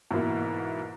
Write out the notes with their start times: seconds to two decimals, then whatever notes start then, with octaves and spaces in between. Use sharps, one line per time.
0.11 G#2 B2 E3 A#3 E4